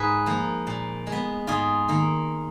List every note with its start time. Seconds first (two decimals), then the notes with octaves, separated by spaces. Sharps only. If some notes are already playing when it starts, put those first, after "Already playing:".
Already playing: G#2 G#4 B4
0.26 F3 A#3
0.67 A#2
1.07 G#3
1.12 B3
1.47 G#2 F4 G#4
1.88 D#3 A#3